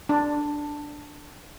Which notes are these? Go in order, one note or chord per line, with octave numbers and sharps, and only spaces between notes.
D4